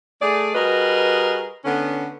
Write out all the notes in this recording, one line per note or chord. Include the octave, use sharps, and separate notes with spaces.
A3 G#4 D5
G3 F#4 G#4 A#4 B4 D#5
D3 B3 C#4